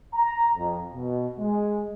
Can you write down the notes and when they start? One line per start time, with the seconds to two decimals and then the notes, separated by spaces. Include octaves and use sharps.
0.14 A#5
0.56 F2
0.93 B2
1.38 G#3